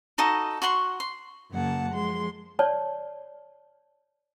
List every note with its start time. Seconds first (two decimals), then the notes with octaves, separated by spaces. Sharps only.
0.18 D#4 F#4 A4 D#5
0.62 F#4 F#5 C6 C#6
1.00 C6
1.51 F#2 C#3 A#3 F#5 A5
1.90 F3 G#3 C6
2.59 C#5 D5 A5